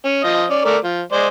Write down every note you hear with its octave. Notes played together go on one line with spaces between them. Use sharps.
C#4
F3 D#5
C#4 D5
A3 A#4 D5
F3
G#3 C5 D5